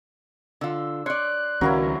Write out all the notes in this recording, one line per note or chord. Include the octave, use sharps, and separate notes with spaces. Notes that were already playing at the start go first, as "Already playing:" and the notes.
D3 F4 E6
C#5 D5 C6 F#6
C#2 D#3 F#3 A#3 C#4 E4